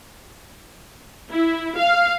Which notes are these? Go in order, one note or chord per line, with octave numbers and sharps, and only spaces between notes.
E4
F5